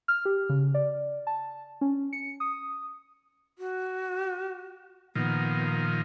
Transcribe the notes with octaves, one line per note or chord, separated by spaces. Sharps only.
F6
G4
C#3
D5
A5
C#4
C#7
D#6
F#4
A#2 D#3 F3 B3